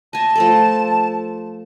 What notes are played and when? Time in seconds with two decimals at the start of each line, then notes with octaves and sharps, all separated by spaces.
0.13 D#5 G#5 A5
0.36 F3 A3 A4